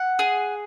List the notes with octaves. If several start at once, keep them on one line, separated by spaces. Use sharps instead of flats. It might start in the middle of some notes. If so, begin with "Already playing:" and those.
Already playing: F#5
G#4